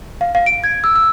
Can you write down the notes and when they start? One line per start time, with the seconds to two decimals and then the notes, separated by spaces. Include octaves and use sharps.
0.21 F5
0.35 F5
0.46 D7
0.64 G#6
0.84 E6
0.96 E6